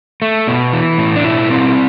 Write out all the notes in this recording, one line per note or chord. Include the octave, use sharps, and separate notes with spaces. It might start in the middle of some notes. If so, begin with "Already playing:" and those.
A3
B2
E3
A2
D4
B2 E4
C4